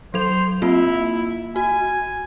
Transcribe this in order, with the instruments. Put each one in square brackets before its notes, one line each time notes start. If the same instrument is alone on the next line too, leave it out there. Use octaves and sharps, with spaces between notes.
[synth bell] F#3 A4 F7 [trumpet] C5
[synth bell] A#3 C4 F4 [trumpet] E4
[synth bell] F#4 [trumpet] G#5